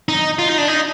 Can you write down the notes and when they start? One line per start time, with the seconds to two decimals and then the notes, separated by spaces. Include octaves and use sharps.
0.09 D#4
0.39 F4
0.49 D#4
0.58 D4
0.68 D#4